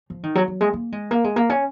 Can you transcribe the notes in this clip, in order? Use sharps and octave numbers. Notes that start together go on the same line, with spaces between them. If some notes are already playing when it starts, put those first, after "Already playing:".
F3
D#3
F#3
F#3
G#3
A#3
G#3
A#3
G#3
A#3
C#4